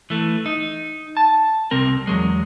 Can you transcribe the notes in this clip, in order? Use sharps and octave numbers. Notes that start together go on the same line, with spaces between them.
E3 A3
D#4
A5
C2 C4 A#4
E2 F#3 G#3